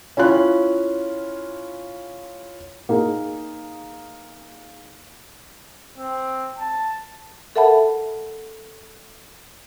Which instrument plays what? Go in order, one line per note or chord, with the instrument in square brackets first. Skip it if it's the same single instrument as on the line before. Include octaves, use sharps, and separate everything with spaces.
[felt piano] C#4 E4 F4 F#6
A#3 D#4 G#4
[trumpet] C4
A5
[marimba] A4 A#4 E5 F#5 A5 B5